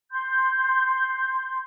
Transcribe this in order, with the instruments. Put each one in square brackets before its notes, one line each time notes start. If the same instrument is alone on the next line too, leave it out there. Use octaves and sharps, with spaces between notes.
[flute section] C6 G6